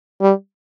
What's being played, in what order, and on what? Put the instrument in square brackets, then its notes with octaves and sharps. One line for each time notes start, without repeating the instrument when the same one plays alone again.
[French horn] G3